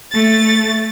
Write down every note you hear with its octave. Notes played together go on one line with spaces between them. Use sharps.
A3 A6